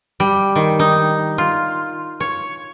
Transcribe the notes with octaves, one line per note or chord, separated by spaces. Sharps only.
G3
D#3
D#4
F4
C#5